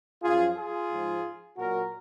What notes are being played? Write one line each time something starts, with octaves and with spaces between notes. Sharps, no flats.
F#2 F3 F4 G#4
F4 G#4
G#2 F3
A#2 F#3 F#4 A#4